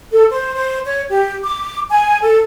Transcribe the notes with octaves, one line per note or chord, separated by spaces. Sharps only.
A4
C5
C5
C#5
G4
D6
G#5
A4